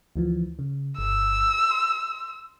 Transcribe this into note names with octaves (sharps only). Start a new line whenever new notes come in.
D2 E3 F3
C#3
G1 E6
C6